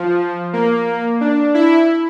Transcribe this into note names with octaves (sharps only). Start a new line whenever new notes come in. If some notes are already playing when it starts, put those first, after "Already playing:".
Already playing: F3
A#3
D4
E4